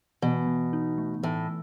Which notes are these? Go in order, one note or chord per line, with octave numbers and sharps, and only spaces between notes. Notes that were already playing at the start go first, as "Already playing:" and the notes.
B2 E3
E3
D#4
A3
A2 E3